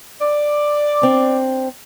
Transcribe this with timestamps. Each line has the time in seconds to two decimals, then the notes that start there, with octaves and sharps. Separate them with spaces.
0.21 D5
1.02 C4 D4